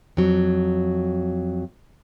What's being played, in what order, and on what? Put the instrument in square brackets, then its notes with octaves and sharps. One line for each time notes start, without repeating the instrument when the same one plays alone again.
[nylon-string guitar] F2 F#3